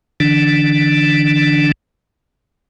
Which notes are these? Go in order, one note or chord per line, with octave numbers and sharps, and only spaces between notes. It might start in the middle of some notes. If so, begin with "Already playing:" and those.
D3 E3 D4